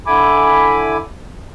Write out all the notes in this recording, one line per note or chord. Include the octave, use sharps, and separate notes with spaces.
D3 E4 G#5 B5 D6